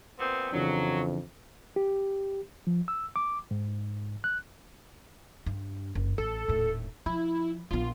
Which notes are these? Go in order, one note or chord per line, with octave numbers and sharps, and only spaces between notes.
A#2 B3 C4
F2 C#3 E3 F#3 D4
G4
F3
E6
D6
G#2
F#6
G2
F#1
A1 A4
D#1 A2
F3 E4
A#1 B3 F4